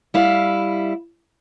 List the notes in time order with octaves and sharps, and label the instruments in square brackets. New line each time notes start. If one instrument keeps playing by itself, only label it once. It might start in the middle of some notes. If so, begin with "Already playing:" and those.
[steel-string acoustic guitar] G3 E4 F5